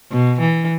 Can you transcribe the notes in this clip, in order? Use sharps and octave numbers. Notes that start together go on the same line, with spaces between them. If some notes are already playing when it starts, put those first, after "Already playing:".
B2
E3